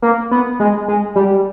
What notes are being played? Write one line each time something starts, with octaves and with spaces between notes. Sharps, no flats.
A#3
B3
G#3
G#3
G3